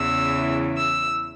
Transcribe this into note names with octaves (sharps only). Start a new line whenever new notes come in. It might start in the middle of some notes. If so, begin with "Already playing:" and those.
Already playing: E2 C#3 E3 E6
E6